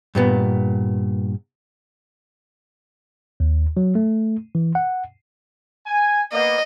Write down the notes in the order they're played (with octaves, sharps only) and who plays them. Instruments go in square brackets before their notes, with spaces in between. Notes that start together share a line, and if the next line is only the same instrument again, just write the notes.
[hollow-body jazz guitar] G2 A#2 B3
[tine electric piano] D#2
F#3
A3
E3
F#5
[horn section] G#5
[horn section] A#3 B3 [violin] D#5